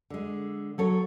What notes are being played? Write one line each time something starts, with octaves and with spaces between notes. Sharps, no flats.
D3 G#3
F#3 A4 C#5